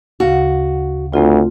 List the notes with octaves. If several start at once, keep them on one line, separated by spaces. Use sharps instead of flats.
D2 C#3 F#4 F5
D2 A3 C4 F4